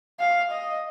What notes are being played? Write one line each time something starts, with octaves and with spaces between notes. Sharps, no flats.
F5
D#5